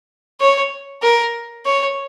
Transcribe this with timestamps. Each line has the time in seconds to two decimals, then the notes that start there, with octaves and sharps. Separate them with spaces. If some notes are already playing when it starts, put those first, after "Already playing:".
0.40 C#5
1.02 A#4
1.65 C#5